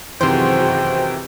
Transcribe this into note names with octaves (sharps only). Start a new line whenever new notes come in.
F#2 C3 D#3 E3 F#4 G#4 C5 G5